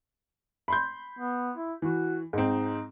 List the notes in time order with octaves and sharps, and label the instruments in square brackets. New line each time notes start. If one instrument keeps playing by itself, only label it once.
[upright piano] B5 C6 G6
[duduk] B3
E4
[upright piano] E3 [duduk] F#4
[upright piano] G#2 C4 [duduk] D#4